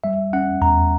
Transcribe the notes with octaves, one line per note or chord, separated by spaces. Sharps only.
G3 E5
C#4 F#5
E2 A#5